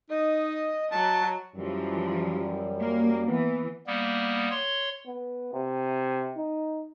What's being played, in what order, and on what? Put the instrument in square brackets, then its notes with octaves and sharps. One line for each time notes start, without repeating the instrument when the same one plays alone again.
[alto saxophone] D#4 [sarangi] D#5
[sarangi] F#3 [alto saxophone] A5
[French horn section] F#2 G3 [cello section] E3 F3
[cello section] A#3
[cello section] E3 [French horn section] B3
[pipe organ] G3 A#3 B3
C#5 C6
[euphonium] B3
C3
D#4